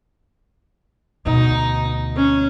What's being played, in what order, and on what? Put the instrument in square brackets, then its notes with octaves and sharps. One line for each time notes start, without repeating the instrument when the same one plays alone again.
[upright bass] D2 B2 [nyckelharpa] D#4
[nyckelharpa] C#4